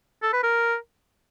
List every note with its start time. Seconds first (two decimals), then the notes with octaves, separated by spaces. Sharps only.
0.23 A4
0.33 B4
0.43 A#4